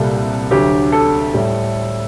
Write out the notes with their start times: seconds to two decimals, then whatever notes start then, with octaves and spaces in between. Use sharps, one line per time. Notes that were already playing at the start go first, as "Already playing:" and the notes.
Already playing: C2 A#2 G3 A4
0.51 D2 D3 F#3 G4
0.92 A4
1.34 A2 G3